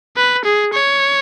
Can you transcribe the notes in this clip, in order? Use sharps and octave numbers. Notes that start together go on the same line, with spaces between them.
B4
G#4
C#5